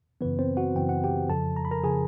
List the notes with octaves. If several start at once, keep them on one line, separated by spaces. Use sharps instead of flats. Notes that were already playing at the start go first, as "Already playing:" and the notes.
F#2 C#3 E3 B3 B4
C4 C5
F#4 F#5
F#2 C#3 E3 G5
F#5
G4 G5
F2 C#3 F3 A4 A5
A#5
B5
A#4 A#5
C#3 F3 G#4 G#5